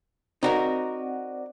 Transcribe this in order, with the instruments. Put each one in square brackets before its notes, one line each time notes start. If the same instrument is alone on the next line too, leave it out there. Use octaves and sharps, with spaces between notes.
[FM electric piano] C4 D5 F#5 [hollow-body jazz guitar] D#4 F#4 A#4